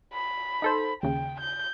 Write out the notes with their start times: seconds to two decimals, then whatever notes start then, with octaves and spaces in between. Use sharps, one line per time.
0.14 B5
0.62 D#4 A4 C5
1.03 D#2 C#3 G5
1.40 G6